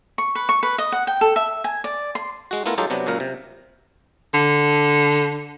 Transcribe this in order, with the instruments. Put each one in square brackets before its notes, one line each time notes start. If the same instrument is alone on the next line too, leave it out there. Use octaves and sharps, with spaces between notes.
[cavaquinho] C#6
B4
C#6
B4
D#5
F#5
G5
A4
E5
G#5
D5
C6
[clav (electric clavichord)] G#3 F#4
A3 B3 E4 F4 A#4
F#3 G#3 D#4 F4 G4 A4
C3 F#3 B3 D4
C#2 F#2 A#2 A#4 F5
C3
[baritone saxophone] D3